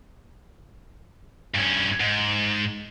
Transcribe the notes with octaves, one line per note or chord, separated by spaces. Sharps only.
G2 C#4
G#2